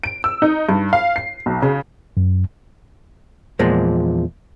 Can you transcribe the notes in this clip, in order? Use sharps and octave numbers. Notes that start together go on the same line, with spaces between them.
D7
E6
D#4
G2
F5
C7
B1
C#3
F#2
E2 A#2 F3 G#3